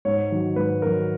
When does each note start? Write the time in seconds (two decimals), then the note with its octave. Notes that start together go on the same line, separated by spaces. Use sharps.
0.05 G#2 C#5
0.32 D#3 F#3
0.56 G#2 B4
0.82 D#3 F#3 A#4